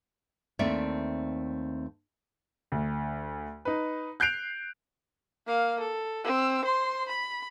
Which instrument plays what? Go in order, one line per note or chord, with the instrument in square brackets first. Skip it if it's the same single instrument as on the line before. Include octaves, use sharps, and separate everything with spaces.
[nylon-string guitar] D#2 A3 C4 D4 D5 E5
[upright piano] D2
D#4 B4
F#6 G6 C7 D7 F7
[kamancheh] A#3 F5
A4
C4 E6
C5 C6
B5